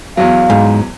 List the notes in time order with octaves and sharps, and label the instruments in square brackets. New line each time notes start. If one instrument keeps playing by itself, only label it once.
[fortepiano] E2 F#3 [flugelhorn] F5
[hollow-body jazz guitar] G#2